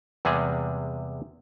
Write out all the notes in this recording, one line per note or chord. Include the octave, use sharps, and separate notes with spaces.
E2 C3 G3 G#3 G#4